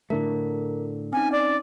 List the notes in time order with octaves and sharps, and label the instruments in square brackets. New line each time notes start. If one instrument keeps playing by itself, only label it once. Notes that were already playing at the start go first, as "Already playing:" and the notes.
[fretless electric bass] A2 D3 A3 [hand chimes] A#4
[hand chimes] C4 C#4 D#4 [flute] G#5
[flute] D5